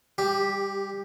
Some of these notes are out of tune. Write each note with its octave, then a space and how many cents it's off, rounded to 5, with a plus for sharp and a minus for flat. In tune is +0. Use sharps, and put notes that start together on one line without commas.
G3 +25 G4 +0